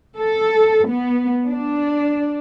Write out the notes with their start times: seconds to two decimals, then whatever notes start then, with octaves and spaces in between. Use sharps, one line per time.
0.17 A4
0.88 B3
1.47 D4